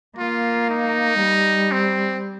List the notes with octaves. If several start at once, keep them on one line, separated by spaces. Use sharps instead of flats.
A#3 F4
D#4
G3
C4